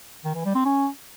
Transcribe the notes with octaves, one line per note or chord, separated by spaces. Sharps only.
D#3
E3
G3
C4
C#4